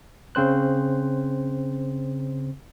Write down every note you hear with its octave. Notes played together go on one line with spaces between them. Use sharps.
C#3 C4 C5 F#6